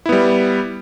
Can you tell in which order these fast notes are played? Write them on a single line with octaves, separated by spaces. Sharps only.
E4 B3 G3